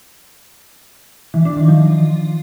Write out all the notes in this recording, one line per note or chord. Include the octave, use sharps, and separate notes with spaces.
E3
D4
D#3
F3